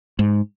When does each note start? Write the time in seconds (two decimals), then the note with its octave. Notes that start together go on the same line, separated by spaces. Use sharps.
0.19 G#2